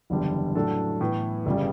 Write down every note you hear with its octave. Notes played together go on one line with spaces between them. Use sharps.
F#1 E2 D3 G3
A2 F#3 A3 D4 A4
A2 E3 B3
G1 C#3 G3